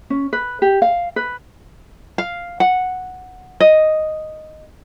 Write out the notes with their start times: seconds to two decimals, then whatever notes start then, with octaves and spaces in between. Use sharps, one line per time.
0.10 C#4
0.33 B4
0.62 G4
0.82 F5
1.16 B4
2.18 F5
2.60 F#5
3.60 D#5